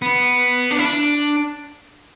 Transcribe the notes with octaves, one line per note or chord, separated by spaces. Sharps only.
B3
D4
E4
D4